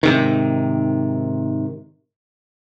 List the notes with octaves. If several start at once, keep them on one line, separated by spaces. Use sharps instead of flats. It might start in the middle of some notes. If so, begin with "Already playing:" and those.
G#2 C3 D#3